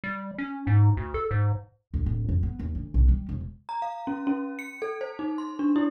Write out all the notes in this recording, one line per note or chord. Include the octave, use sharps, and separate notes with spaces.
G3
C#4
G#2
D2
A4
G#2
D2
D1
F2
B3
D#2
D2
B1
G3
E1
A#5
F5
C#4
C#4
C#7
A4
C5
D#4
C6
D4
E4